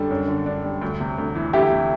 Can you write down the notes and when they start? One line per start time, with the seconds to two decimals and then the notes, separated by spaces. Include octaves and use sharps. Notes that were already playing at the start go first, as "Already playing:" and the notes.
Already playing: F#2 D3 G3 D4 A4
0.11 F#2
0.28 D3
0.46 D4
0.64 G3
0.81 D2
1.00 C3
1.18 D2
1.35 E3
1.53 D2 E4 G4
1.72 C3